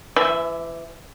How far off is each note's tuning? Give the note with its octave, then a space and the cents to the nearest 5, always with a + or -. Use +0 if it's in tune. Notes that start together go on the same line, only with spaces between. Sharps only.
E3 +30 E5 -5